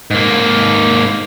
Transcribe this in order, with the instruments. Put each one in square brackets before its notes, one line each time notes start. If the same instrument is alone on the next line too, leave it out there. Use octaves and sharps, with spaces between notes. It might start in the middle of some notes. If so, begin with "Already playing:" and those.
[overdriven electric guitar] G#2 A#3